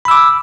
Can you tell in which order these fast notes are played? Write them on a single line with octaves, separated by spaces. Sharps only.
B5 E6 D6